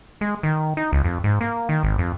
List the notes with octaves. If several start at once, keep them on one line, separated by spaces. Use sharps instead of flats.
G#3
D#3
D#4
C#2
F2
G#2
A#3
D#3
G#1
F2